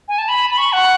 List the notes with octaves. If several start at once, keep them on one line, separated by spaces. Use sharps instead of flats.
G#5
A5
B5
B5
C#6
F#5